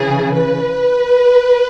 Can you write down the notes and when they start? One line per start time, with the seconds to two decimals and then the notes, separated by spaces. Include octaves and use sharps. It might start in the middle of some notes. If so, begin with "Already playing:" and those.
Already playing: C#3 E3 G#4
0.32 B4